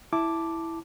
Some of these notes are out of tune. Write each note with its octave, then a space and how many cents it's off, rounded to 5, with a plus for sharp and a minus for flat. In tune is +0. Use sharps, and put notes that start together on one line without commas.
E4 +0 A5 +0 D6 +0